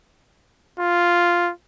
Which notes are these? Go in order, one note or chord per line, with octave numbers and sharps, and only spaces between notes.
F4